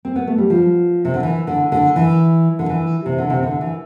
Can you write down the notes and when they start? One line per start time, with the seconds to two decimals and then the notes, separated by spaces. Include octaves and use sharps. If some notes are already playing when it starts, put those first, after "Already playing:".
0.05 C4
0.16 B3
0.27 A3
0.38 G3
0.50 F3
1.05 C3
1.14 D3
1.23 E3
1.47 D3
1.72 D3
1.96 E3
2.59 D3
2.69 E3
3.06 C3
3.18 D3
3.30 C3
3.43 D3
3.61 E3